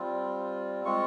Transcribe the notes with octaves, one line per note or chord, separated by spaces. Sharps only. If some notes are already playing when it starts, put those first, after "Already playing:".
Already playing: G3 C4 F4
G#3 C4 F4 C#6